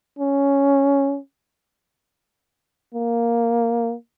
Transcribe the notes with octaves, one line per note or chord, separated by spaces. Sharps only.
C#4
A#3